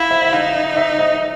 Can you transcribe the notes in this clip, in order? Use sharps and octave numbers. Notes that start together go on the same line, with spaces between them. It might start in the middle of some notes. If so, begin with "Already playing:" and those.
Already playing: E4 F5
E5
E5
D#4 F5
E5
D#5